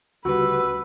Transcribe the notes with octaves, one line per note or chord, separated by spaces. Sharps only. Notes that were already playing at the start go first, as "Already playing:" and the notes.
D2 C#3 G3 F#4 B4 E6